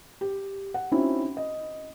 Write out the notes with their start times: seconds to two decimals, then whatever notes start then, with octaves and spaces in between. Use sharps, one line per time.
0.21 G4
0.74 F#5
0.92 C4 C#4 D#4 E4 F#4
1.37 D#5